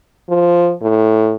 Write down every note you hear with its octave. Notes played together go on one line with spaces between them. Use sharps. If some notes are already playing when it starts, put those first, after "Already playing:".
F3
A2